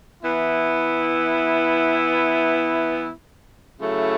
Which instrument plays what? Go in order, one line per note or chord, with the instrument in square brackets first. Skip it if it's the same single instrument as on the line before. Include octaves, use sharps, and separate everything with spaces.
[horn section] E3 B3 E4
C#3 F#3 A3 E4